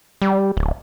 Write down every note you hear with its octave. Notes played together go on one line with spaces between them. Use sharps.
G3
D1